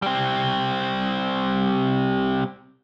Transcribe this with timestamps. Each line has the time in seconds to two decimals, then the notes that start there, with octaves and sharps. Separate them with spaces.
0.02 G3 C4